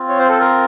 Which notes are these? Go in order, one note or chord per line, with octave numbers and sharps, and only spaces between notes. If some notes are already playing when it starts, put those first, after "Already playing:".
Already playing: C4 F4
C#5
C5
A4
A#4